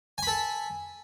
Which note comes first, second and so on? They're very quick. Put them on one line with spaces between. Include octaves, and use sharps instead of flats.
G#5 B5 A4